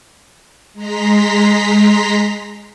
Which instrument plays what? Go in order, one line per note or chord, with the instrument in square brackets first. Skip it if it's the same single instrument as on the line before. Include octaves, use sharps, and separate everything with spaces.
[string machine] G#3 A#5 C6 B6